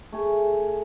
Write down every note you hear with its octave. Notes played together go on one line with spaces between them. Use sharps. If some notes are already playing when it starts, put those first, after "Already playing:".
A3 G#4